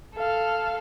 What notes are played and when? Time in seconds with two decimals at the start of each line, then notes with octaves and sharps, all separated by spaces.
0.15 A4 F5